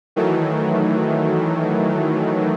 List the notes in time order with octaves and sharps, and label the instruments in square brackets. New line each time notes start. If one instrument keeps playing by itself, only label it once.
[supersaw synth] D#3 E3 F#3 A3